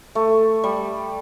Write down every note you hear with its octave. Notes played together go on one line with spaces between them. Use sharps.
A3
G3